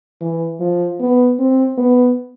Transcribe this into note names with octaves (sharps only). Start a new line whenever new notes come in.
E3
F3
B3
C4
B3